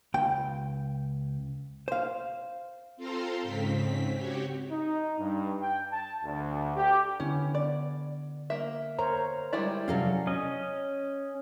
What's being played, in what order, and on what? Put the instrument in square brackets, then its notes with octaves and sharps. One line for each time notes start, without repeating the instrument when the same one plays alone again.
[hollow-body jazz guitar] C#2 G5
C5 F5
[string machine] C4 F4 A4 F5 A#5 C6
G#2 C#3 C4 B6
F#4 G4 C#5
[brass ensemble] D#4
G2
G5
A5
D2
G4
[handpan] D3 B3 E4 [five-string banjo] C#4
[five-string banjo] D5
A#3 E5
[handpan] A#4 C5 C#5 [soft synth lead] A#5
[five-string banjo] G3 G#3 E4 [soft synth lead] D5
[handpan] C3 C#4 [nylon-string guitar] F#3 A4 F5
[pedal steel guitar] C#4 D#5